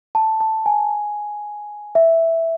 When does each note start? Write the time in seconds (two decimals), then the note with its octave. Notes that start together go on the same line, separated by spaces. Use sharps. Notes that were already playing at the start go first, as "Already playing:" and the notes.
0.15 A5
0.41 A5
0.66 G#5
1.95 E5